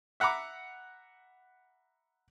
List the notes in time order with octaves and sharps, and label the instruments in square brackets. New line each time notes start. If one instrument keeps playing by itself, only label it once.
[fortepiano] E5 F#5 A#5 B5 D6